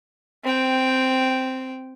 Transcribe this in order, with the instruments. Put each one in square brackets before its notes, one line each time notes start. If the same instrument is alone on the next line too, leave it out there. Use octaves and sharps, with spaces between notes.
[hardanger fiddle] C4 G5